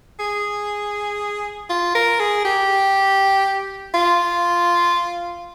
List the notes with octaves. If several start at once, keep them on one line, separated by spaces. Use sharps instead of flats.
G#4
F4
A#4
G#4
G4
F4